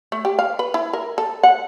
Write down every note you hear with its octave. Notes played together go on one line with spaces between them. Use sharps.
A3
G4
F5
B4
E4
A#4
A4
F#5